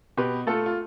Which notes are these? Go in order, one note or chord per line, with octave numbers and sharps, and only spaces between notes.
B2 G4 B4
A3 F4 A4
F4